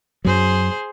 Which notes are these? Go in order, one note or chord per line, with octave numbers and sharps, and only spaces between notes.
F#2 F#3 G#4 C5